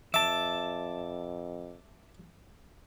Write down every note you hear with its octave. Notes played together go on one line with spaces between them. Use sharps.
F2 E5 A5 D6